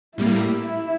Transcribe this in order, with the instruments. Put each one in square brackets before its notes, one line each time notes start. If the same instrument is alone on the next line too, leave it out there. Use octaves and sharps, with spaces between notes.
[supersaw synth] A2 G3 A#3 [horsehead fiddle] E4